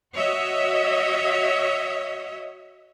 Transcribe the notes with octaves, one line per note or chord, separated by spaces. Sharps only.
F#4 C#5 D#5 E5